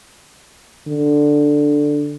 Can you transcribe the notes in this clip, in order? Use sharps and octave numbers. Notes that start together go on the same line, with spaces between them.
D3